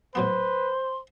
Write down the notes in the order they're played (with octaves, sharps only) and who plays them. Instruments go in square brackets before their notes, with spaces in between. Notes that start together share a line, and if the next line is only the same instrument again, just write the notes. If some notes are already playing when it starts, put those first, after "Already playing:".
[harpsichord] A2 F#3 B3 [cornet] B4 [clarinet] C5 [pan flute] C6